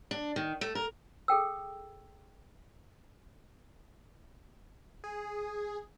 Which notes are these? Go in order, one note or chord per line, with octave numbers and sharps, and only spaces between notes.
D4
D#3
A3
A#4
G#4 A4 G5 E6
G#4